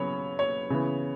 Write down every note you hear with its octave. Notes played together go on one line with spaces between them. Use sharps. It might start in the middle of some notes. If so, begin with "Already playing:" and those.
Already playing: C#3 F#3 B3 C#5
C#5
C#3 E3 B3